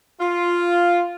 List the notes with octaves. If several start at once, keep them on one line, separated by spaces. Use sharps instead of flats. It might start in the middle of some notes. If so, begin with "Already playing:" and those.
F4